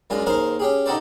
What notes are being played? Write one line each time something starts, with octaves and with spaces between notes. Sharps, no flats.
F#2 G#3 D4 F4 G#5
D#2 G#4 A#4 C5 F5 C6
C#4 G4 G#4
D#4 F#4 G4 A4 C5 D5